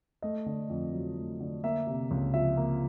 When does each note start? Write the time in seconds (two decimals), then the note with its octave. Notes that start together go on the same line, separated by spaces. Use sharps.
0.22 A3 D#5
0.46 D3
0.70 F2
0.93 F#3
1.17 A3
1.41 D3
1.64 A#3 E5
1.87 C3
2.11 C#2
2.34 F3 E5
2.57 A#3